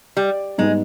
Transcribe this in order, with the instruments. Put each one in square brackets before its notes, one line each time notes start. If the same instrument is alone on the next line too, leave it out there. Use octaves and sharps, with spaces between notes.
[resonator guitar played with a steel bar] G3
[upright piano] G#2 G3 B3 D#4 [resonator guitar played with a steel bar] G#3